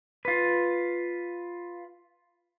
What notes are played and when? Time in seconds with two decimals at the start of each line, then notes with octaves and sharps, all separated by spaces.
0.25 F4 B4